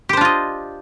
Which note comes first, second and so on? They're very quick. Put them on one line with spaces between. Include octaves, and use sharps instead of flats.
G4 C5 D4 F4 D#5